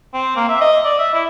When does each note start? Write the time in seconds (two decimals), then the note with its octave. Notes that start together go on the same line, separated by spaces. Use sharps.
0.14 C4
0.36 A#3
0.49 E5
0.61 D#5
0.84 D5
0.99 E5
1.14 E4